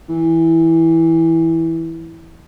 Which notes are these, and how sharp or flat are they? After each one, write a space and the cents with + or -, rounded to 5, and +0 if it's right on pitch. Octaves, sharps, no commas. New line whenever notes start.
E3 -10